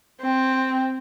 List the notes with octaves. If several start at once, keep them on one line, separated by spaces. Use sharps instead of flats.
C4